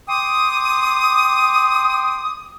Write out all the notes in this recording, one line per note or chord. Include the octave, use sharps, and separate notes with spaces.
G5 C6 D6 D#6